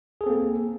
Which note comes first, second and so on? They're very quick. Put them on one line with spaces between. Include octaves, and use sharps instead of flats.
G#4 A4 C4 A#3